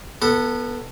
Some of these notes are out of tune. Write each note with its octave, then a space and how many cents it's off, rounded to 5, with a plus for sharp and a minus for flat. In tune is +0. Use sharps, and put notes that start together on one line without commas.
B3 -15 A4 +15